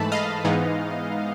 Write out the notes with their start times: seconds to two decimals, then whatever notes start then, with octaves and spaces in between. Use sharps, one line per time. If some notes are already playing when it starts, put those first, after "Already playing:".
Already playing: G#2 E3 A3 A5 B5
0.12 D#5 F5
0.45 G#2 E3 G#3 B3 D#4